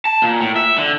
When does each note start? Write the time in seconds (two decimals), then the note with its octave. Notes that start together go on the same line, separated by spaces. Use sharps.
0.05 A5
0.22 A#2
0.41 A2
0.56 E5
0.78 D3